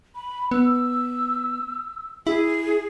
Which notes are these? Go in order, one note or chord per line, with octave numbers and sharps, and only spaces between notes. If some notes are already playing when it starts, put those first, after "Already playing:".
B5
B3 E6
E4 G#4